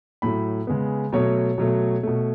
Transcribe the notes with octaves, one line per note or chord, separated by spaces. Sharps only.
A2 F#3 A3 B5
C#3 G#3 B3
B2 F#3 A3 C#5
B2 F#3 A3
B2 A3